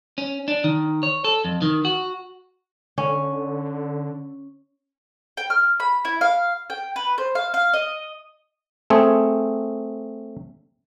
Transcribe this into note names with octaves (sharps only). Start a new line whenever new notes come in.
C#4
D4
D#3
C#5
A4
F2
D#3
F#4
D3 C#4
G5
F6
B5
E4
F5
G5
B4
C5
F5
F5
D#5
A3 C4 G#4